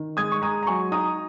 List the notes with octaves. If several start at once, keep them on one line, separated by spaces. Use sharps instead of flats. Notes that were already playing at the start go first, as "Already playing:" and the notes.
Already playing: D#3
G#3 D#6 G#6
C#6
G#3 A#5 D#6
A#5
F#3 G#5 C#6
D#4 A#5 D#6